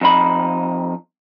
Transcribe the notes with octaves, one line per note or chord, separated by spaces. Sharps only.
F2 D#4 B5